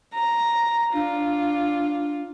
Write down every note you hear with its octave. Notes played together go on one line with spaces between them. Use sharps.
A#5
D4 F4